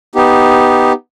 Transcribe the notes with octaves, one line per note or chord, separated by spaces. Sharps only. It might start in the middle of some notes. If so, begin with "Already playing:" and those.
B3 D#4 G4